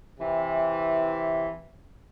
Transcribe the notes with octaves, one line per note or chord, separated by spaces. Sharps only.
C3 E3